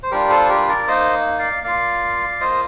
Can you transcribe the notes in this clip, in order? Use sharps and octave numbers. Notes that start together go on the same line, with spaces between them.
C5
G3 D4 F4 G4 A#4
A4 C5
G4 A#4
A#4 D5
A#3 D#4 C5 D#5
D5 F5
A#3 F4 D5 F5
A#3 F4 C5 D#5